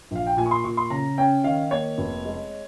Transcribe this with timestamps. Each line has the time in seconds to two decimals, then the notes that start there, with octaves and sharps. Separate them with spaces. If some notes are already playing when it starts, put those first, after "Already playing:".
0.11 A#1 F5
0.27 G5
0.37 A#2 G#5
0.46 C#6
0.51 C6
0.64 A#2 C#6
0.77 C6
0.90 C#3 A#5
1.18 C#4 G5
1.44 D#3 F5
1.71 A#3 C#5
1.98 F1
2.25 G#3